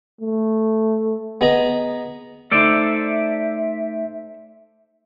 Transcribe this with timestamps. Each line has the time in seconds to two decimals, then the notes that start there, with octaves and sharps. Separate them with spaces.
0.21 A3
1.41 B3 G#4 D#5 A#5
2.51 A3 D#4 A4 C5 D5 E5